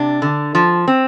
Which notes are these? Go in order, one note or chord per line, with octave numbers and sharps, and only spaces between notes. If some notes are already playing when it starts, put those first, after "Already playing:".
Already playing: C3 D4
D3
F3
C4